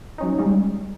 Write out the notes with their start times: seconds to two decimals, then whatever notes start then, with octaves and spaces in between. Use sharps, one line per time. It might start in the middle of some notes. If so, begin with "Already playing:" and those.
0.18 F#3 C#4 D#4
0.39 G3 G#3 C#4 D#4